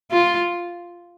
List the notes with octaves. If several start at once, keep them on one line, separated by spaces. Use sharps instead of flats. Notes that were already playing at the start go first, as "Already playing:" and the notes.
F4